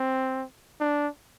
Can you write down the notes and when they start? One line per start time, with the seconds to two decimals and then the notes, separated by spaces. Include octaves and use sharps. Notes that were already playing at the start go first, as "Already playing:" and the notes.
Already playing: C4
0.80 D4